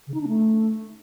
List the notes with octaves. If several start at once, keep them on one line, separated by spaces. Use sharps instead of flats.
C#3
D#4
D4
A3